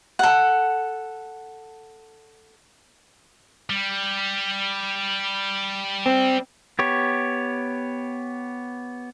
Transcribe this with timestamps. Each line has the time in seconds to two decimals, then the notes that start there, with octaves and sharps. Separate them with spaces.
0.19 A4 F#5
3.70 G3
6.06 C4
6.79 B3 G4 C#5